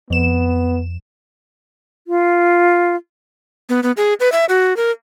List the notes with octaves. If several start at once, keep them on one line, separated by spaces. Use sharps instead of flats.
F2 B3 E7
F4
B3
B3
G#4
B4
E5
F#4
A#4